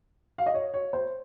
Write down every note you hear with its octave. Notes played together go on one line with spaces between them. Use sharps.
F5
D#5
C#5
C#5
C5